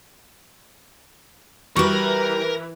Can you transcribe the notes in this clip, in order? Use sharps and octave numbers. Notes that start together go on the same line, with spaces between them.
E3 G3 F#4 A#4 B4 A#5 C#6